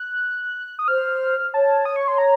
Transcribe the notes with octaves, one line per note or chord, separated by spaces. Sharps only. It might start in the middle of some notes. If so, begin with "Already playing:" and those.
Already playing: F#6
D#6
C5 F6
C#5 A5
D#6
C#6
C6
A#5